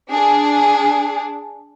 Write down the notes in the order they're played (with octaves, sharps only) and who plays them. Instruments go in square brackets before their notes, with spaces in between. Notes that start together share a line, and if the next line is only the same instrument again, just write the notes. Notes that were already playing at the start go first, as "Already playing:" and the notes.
[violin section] D4 G#4